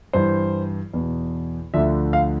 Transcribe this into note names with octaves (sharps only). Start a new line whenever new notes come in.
G2 E3 C5
E2 B2
D2 D3 F3 E5
F5